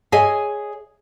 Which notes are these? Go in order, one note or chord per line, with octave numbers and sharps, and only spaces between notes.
G#4 C#5 D#5 E5 G#5